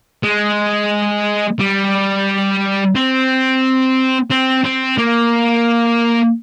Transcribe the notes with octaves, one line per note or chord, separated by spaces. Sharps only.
G#3
G3
C4
C4
C4
A#3